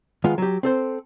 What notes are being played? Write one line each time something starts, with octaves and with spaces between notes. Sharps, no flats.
D#3 G#3 B3 F4
F#3 G4
C4 A4 C5